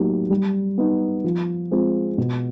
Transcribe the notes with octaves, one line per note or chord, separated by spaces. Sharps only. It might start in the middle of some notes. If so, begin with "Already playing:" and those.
Already playing: A2 F#3 A#3 D#4 G4
G3
B3 D#4
F3
G#3 C4 F4
B2